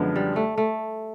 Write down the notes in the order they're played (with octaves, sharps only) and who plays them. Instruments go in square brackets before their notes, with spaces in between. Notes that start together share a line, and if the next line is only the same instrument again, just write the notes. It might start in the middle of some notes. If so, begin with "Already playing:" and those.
Already playing: [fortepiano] F#2 D3 F3 G#3 B3
[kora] G3
A3
A3